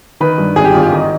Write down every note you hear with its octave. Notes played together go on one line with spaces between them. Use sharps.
D#3 B4
G2
G#1 G#4
G4
G#1 F4
G4
D#3 D#4